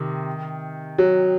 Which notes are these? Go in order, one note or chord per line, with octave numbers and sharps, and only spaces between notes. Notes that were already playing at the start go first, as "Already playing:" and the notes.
Already playing: C3 D#3
F#3